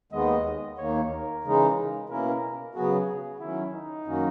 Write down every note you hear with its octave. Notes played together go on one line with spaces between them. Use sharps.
D#2 D#3 G#3 B3 D#5
D#2 D#3 A#3 C#5
A#4
C#3 E3 G#3 D#4
B2 A#3 C#4 E4 A#4
C#3 F#3 B3 F#4 G#4
D#3 F#3 C#4 E4
D#4
F#2 D#3 A#3 C#4 F#4